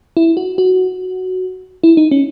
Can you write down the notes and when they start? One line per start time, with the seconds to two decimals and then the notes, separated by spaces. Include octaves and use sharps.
0.17 E4
0.37 F#4
0.58 F#4
1.84 E4
1.97 D#4
2.11 C#4